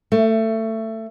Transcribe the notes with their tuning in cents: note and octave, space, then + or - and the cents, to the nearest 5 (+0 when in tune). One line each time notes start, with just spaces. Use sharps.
A3 +20